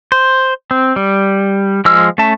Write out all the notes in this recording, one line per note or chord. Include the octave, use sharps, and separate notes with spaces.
C5
C4
G3
F3 G#3 E6 F6
A3 C#4 E5 A5